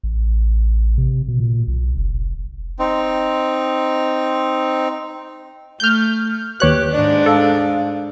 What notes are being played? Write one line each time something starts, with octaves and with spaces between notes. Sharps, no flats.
A1
C3
B2
A#2
B1
F1
C4 D#4
A3 F6 G6
D#2 G4 B4 C#5 F#6
G#2 G#3 D4 D5
A4 F5